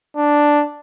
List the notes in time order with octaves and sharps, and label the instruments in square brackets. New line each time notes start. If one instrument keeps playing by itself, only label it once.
[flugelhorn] D4